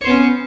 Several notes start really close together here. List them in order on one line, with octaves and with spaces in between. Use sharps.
C#5 C5 B3 C#4